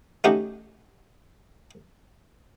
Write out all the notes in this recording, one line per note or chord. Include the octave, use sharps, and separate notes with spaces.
A3 C#4 D#4 F#4 G4